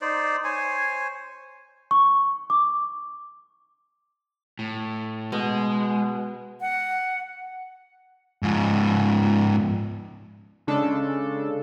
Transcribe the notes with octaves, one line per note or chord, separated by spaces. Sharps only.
D#4 C5 D5
C5 C#5 G#5
C#6
D6
A2
B2 G#3
F#5
G#2 F3
C#3 G#3 D4 A4